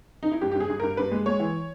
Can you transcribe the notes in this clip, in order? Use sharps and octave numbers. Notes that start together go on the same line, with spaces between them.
D#4
E4
G2 G4
G4
G2
G#4
G2
G2 A#4
G2 B4
G#3
G#3 C#5
E3